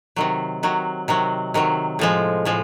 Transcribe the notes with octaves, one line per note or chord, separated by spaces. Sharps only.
C3 D#3 F#3
C3 D#3 F#3
C3 D#3 F#3
C3 D#3 F#3
A2 F3 G#3
A2 F3 G#3